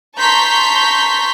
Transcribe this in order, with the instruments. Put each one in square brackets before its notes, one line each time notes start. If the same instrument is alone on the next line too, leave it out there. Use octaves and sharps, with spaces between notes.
[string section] A5 A#5 C6 C#6 G6 B6